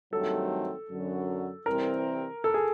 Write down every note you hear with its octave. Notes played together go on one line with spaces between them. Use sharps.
G2 D#3 F#3 A3 C4 A4
F#2 D3 F#3
C2 C3 E3 G3 C4 A#4
A4
G#4